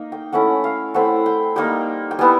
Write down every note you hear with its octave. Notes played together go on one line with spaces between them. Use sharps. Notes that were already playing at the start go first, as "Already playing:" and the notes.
Already playing: A#3 D#4
G5
A3 C#4 E4 F#5
F5
A3 C4 E4 F#5
G5
G3 A#3 D#4 G5
G5
G3 B3 E4 G#5